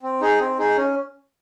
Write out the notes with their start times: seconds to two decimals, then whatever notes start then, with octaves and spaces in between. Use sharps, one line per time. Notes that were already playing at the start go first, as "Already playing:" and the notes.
0.03 C4
0.21 D#4 G#4
0.40 C4
0.59 D#4 G#4
0.77 C#4